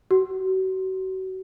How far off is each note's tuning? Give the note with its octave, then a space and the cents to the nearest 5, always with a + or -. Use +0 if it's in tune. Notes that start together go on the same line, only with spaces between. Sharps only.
F#4 +35